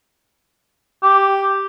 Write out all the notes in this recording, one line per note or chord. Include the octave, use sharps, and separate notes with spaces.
G4